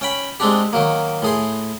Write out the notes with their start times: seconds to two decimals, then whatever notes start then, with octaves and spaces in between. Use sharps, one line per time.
0.01 C#4 G5 B5
0.40 G#3 C4 D4 G4
0.73 D#3 F#3 A#3
1.22 A2 G#4 C6